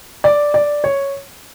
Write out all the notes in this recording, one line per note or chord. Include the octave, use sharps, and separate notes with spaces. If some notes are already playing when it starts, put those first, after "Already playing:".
D5
D5
C#5